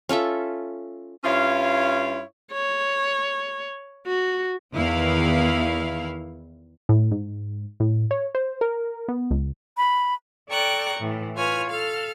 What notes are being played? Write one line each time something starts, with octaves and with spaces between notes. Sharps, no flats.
C#4 F4 A4 E5
G2 C#4 E4 F4 C#5 F5
C#5
F#4
E2 D#3 E4 F5
A2
G#2
A2
C#5
C5
A#4
B3
C#2
B5
A4 D5 G5 A#5 C#6 F#6
A2 E3
F4 B4 C#5 G#5 F6
A4 F5 F6